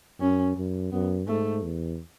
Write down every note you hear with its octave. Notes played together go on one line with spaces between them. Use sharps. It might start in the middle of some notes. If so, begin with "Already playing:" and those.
F#2 C#4
F#2
F#2 B3
G#2 A3
E2